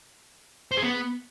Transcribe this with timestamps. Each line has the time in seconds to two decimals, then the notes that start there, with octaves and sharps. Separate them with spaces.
0.72 C5
0.77 G#4
0.83 B3